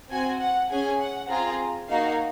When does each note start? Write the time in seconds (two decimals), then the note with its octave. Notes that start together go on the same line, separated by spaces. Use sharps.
0.10 C4 F#4 G#5
0.40 F#5
0.70 C#4 G#4 G#5
0.99 F#5
1.29 C4 F4 G#4 A#5
1.89 A#3 D#4 F#4 F5